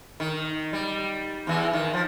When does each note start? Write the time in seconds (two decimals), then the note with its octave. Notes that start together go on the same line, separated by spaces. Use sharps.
0.20 D#3
0.73 G3
1.47 E2 E3
1.73 D#3
1.94 F3